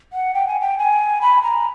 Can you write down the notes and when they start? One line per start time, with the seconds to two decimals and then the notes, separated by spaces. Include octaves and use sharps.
0.13 F#5
0.34 G5
0.47 G#5
0.61 G5
0.78 G#5
1.22 B5
1.42 A#5